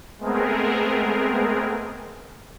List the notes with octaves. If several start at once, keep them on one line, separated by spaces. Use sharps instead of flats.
G#3 A3 B3 C4 G#4 A#4